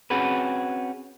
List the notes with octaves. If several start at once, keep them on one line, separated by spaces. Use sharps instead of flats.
C4 C#4 F#4 G#4 B4